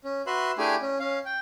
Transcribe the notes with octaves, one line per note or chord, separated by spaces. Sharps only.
C#4
F#4 B4 E5 C6 F#6
A3 D4 E4 G4 G#4 G#5
C#4
C#4 F5
G5